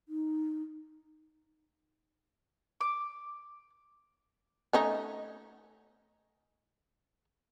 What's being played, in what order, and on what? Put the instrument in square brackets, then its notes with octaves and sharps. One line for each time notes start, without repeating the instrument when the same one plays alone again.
[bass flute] D#4
[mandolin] D6
[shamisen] A3 C#4 D#4